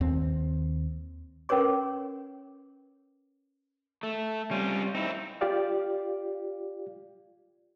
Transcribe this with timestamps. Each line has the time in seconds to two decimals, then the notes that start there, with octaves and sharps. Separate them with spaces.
0.01 D#2 C4
1.49 C#4 A#4 B4 C#5 D6
4.03 A3
4.51 G3 C4 C#4 F4
4.95 C4 D#4 E4
5.41 F4 G4 D5 F5